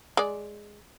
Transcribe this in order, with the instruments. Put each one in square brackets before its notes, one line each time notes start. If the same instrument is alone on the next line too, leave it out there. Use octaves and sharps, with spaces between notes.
[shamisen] G#3 D5